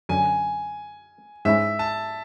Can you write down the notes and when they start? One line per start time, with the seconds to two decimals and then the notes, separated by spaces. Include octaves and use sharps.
0.09 F#2 D3 F#3 G#5
1.45 G#2 G#3 C#4 E4 E5
1.79 A5